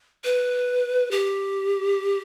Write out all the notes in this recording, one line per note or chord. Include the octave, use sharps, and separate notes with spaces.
B4
G4